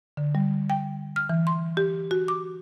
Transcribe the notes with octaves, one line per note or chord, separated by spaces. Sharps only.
D3
G3
G5
F6
E3
C6
G4
F#4
D6